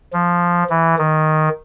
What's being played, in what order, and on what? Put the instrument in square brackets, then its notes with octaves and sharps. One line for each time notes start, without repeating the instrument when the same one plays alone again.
[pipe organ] F3
E3
D#3